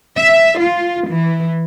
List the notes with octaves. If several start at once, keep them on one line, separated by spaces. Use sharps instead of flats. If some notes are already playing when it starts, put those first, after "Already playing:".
E5
F4
E3